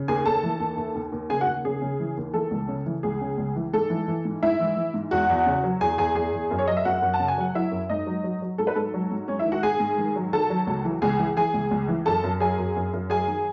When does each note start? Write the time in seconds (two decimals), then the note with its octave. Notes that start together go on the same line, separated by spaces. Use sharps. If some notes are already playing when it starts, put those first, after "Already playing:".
Already playing: C#3
0.08 D#2 G#4 G#5
0.25 D#2 A4 A5
0.43 E3
0.60 D#2
0.77 D#2
0.95 D#2
1.12 D#2
1.30 C#3 G#4 G#5
1.41 F#4 F#5
1.47 D#2
1.65 C#3 G#4
1.82 C#3
2.00 E3
2.17 D#2
2.34 E3 A4
2.51 C#2
2.68 C#3
2.86 E3
3.03 C#2 G#4
3.21 C#3
3.38 C#2
3.56 E3
3.73 G#2 A4
3.90 E3
4.08 E3
4.25 G#2
4.43 G#2 E4 E5
4.60 E3
4.77 E3
4.94 G#2
5.11 E2 F#4 F#5
5.30 E2
5.46 C#3
5.64 F#3
5.81 E2 G#4 G#5
5.98 E2 G#4 G#5
6.15 E2 G#4 G#5
6.33 E2
6.51 F#2
6.59 C#5
6.67 F#3 D#5
6.77 E5
6.85 F#2 F#4 F#5
7.02 F#2
7.14 A5
7.20 C#3
7.28 G#5
7.38 F#3 F#5
7.55 F#3 E4 E5
7.72 F#2
7.89 G#2 D#4 D#5
8.07 F#3
8.24 F#3
8.42 F#3
8.58 G#2 A4
8.67 B4
8.75 G#2 A4
8.94 F#3
9.11 G#2
9.28 G#2 C#4 C#5
9.39 E4 E5
9.46 D#3
9.52 F#4 F#5
9.63 G#2 G#4 G#5
9.80 G#2
9.98 D#3
10.16 F#3
10.33 D#3 A4 A5
10.50 F#3
10.67 C#2
10.84 E3
11.02 C#2 G#4 G#5
11.19 E3
11.37 E3 G#4 G#5
11.54 C#2
11.71 C#2
11.88 E3
12.06 F#2 A4 A5
12.24 F#2
12.40 F#3 G#4 G#5
12.59 F#2
12.76 F#2
12.93 F#2
13.10 F#3 G#4 G#5
13.27 D#3